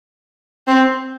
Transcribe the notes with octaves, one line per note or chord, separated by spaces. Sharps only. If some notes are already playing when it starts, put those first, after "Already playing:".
C4